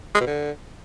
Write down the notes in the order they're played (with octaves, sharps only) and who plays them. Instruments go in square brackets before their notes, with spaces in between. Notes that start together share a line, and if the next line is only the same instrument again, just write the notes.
[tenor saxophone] G#3
B2
D3